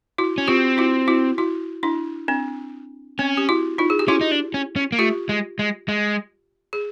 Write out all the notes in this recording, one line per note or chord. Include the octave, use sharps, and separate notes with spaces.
E4 F#4
C#4
C4 F4 G4
E4 F#4
E4 F#4
E4 F#4
D4 E4
C4 D4
C4 C#4
G4
E4 F#4
D#4 F4
G#4
G4
C#4 E4 F#4
D#4
D4
C#4
C#4
A#3
A3 F4 G4
G#3
G#3
G#3
G#4